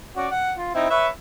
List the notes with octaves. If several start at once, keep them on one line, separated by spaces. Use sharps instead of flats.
C#4 F#4 D5
F#5
F4
C4 D#4 E4
B4 C#5 E5